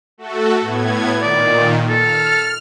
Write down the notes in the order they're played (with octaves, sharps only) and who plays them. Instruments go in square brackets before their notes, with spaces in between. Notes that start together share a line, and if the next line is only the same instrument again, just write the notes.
[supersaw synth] A3 F#4 A4
A2 B3 G#6
[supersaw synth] A#2 D#3 [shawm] D5
[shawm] A4 [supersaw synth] F6